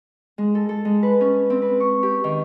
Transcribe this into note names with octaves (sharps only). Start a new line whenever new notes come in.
G#3
A4
A4
G#3
B4
C#4
C4
B4
C#6
G4
D#3